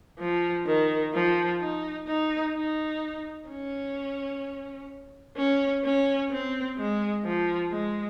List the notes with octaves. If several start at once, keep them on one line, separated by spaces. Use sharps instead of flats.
F3
D#3
F3
D#4
D#4
D#4
C#4
C#4
C#4
C4
G#3
F3
G#3